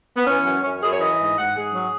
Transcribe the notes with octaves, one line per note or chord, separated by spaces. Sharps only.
B3
E3 C#4
F#2
F#2 C#4
F#2 G#4
C#5
E3 D#5
G#2
G#2 F#5
G#2 G#4
F#3